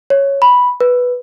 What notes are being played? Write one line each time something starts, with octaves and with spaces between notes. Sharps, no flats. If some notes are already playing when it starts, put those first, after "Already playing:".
C#5
B5
B4